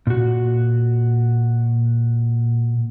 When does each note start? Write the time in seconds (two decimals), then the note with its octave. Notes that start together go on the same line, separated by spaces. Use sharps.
0.07 A#2 F#4